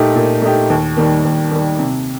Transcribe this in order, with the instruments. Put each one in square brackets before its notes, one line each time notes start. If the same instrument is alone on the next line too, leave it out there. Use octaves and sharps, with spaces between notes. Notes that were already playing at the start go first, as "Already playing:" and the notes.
Already playing: [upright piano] A#2 A3 D#4 G4
A#2
A3 D#4 G4
D#2
D#3 G3 A#3
D#2
D#3 G3 A#3
C3